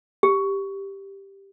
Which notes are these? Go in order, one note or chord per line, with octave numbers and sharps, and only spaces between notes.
G4